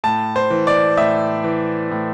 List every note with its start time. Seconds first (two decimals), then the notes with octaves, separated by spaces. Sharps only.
0.04 A2 A5
0.36 C5
0.50 E3
0.67 D5
0.97 A2 E5
1.44 E3
1.91 A2